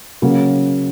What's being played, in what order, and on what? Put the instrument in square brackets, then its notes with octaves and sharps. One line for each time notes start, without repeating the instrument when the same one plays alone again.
[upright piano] C#3 F#3 A#3